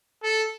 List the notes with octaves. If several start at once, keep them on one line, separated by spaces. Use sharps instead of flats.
A4